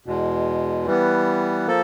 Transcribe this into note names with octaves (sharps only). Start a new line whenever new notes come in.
E2 B2 G#3
E3 G3 B3
F3 A#3 A4